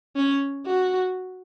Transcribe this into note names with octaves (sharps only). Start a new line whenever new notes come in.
C#4
F#4